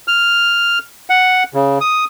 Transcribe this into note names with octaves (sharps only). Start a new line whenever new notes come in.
F6
F#5
C#3
D#6